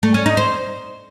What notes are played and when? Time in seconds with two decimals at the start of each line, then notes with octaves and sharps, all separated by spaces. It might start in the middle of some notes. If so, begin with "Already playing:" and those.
0.03 A3
0.14 C#4
0.26 D#4
0.37 C5